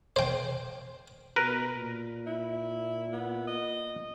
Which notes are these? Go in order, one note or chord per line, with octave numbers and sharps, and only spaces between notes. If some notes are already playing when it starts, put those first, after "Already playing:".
C5 G5
B2 A#4 B4
A#2
E4
B3
D#5